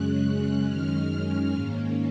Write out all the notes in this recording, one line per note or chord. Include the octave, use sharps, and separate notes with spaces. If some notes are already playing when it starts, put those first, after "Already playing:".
Already playing: F#2 C#3 G#3 C#4 F#6
F#6
F#2 D#3 G#3 C#4 F6
G#2 D#3 A#3 C#4